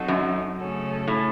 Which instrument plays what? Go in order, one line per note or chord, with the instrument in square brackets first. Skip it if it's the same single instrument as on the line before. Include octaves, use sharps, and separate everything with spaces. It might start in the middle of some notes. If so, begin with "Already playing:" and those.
Already playing: [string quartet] F#3 C4 D#4 F#4 A4
[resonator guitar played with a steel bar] F#2
[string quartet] C#3 A3 C#4 A4
[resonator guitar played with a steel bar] A2